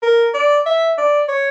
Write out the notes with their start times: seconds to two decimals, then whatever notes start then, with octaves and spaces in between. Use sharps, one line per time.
0.02 A#4
0.34 D5
0.66 E5
0.98 D5
1.28 C#5